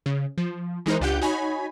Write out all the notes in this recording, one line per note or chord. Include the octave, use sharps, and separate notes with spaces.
C#3
F3
E3 G#3 D#4 A#4 C5
C#2 D4 F4 G4 F#5 G6
D#4 F#4 C#5 G#5 B5